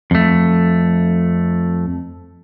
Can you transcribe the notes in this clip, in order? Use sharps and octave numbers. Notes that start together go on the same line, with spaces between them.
F2 A3